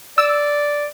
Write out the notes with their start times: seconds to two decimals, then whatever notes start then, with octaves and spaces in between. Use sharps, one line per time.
0.18 D5 E6